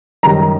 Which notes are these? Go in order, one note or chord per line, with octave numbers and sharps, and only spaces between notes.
F#2 D#3 G3 A#5